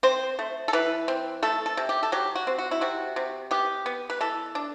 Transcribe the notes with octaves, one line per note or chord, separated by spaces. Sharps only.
C4 C5
A3
A4
E3 B4
C4
A3 A4
A4
C3
G4
A4
F#3 G4
F#4
C4
F#4
E4
C3 F#4
C3
B3 G4
B3
B4
E3 A4
D4